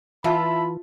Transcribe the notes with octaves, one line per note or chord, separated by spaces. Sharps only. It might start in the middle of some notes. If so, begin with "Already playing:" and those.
E3 F4 E5 A5 B5